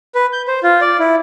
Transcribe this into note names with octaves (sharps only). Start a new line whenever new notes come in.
B4
G6
C5
F4
D5
E4